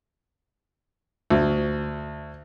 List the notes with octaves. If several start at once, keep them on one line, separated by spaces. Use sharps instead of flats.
D2